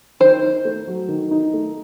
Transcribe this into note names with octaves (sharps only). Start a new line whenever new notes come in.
D#3 C5
D#4
A3
F#3
D#3
D#4
A3